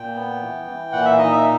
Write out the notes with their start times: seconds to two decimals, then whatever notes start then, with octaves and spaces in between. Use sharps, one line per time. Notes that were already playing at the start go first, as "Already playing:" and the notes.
Already playing: A#2 G5
0.15 B3
0.41 E3
0.67 E3
0.93 A#2 F#5
1.06 E5
1.18 D#4 D#5
1.32 E5